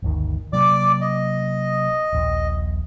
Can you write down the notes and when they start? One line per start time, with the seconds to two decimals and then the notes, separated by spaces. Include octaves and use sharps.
0.03 G1 D2 D#3
0.53 C3 F#3 A#3 D5 D6
1.01 D#5
2.13 D#1 A#1